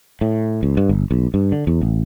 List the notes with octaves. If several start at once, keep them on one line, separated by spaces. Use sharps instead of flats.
A2
C#2
G2
G1
B1
G2
D3
E2
A1